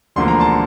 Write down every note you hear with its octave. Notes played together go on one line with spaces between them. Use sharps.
E1 D2 D3 F3 A#3 C6
A#5
A5 C6